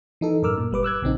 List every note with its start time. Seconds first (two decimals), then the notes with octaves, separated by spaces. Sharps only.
0.21 E3 D#4 A4
0.42 F#2 A2 A#4 D6 E6 F6
0.57 A#2
0.71 G1 G3 B4 D6
0.83 D6 E6 F#6 G#6
1.02 A#1 C#3 C4 D#4